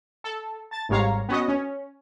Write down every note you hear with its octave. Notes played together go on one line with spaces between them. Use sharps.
A4
A5 A6
G#1 G#2 G3 C#5 F5 A#5
B3 C#4 F#4 D#5
C#4